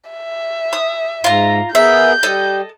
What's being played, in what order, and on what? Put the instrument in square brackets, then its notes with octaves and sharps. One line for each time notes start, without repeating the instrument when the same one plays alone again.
[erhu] E5
[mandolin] D#6
[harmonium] G#2 [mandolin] F4 A#5
[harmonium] B3 G#4 A#4 [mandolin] E5 [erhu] G6
[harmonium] G3 [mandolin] A4 D#5